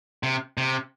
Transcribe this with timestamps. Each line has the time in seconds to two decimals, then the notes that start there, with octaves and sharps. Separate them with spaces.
0.23 C3
0.58 C3